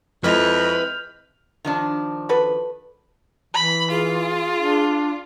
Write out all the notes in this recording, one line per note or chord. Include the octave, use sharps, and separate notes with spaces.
F2 G#3 E4 B4 D#5 F6 G6 F7
D#3 F3 D4
F#4 A4 B4
E3 B5
F4 G#4
D4